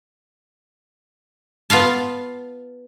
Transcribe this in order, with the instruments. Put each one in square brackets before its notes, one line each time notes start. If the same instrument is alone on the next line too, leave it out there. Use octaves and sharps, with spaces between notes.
[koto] B3 F4 F5 A5